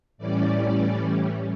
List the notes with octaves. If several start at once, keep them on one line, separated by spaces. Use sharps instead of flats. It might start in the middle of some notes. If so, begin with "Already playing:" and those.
A2 E3 G3 C#4 D5